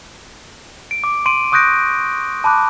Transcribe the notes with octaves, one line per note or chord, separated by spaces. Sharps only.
D7
D6
C6 D7 D#7
C#6 D#6 F#6 G6 A#6 D7
A5 B5 D6 F#6